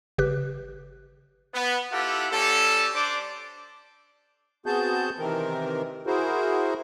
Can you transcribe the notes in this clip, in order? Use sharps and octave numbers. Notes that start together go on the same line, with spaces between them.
G1 C#3 G4 B4 F#6
B3
E4 F4 G4 A4 F#5
G3 C#4 G4 A4
D4 C5 D5 D6
B3 C4 F#4 G#4 A5 G6
C3 D#3 E3 C4 A#4
E4 F#4 G#4 A#4 C5